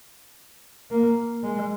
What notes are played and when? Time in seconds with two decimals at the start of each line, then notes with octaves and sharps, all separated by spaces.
0.91 A#3
1.43 G#3